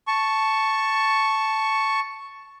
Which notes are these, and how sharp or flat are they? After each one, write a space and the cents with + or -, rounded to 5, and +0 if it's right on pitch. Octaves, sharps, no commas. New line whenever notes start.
A5 +0 C#6 +0